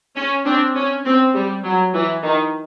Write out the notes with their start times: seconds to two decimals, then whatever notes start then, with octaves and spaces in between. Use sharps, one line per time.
0.16 C#4
0.45 C4 D4
0.75 C#4
1.05 C4
1.34 G3
1.64 F#3
1.93 E3
2.24 D#3